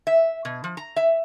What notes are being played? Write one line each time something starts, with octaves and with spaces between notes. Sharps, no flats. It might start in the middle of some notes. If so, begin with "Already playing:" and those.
E5
B2
F3
A#5
E5